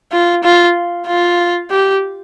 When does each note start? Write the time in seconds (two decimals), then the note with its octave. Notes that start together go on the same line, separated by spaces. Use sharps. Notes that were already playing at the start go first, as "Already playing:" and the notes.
0.12 F4
0.43 F4
1.07 F4
1.71 G4